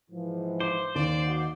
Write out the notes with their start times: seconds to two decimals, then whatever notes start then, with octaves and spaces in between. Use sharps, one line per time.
0.11 G#2 E3 F3
0.60 C5 D6
0.95 D#2 D5
1.24 F#4 D#5 F#5